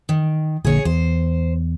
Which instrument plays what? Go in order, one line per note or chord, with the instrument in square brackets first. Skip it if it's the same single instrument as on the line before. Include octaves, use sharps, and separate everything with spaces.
[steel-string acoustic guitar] D#3
[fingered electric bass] A#1 D3 A#3 [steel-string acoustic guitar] G#4 C#5
[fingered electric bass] E2 [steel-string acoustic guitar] C5